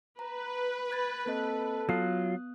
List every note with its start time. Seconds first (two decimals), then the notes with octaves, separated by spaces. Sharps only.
0.19 B4 A#5
0.91 B5 G#6 A6
1.26 A#3 C4 A4 D#5
1.89 F#3 B3 F4 D#6 F#6